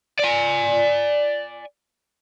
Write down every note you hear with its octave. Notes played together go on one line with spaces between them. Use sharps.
D5 G#5